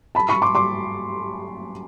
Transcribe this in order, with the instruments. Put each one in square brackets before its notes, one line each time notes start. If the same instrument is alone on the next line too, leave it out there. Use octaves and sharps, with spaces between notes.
[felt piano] A5 B5
B5 C#6
C6 D6
C6 D6